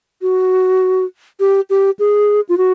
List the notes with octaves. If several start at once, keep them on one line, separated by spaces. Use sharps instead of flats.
F#4
G4
G4
G#4
F4
F#4